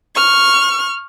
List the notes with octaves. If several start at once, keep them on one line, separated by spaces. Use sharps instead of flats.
C#6 F6